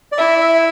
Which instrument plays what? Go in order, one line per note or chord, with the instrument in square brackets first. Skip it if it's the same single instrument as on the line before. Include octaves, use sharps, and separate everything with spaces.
[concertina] D5
[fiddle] E4 [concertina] E5
[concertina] E5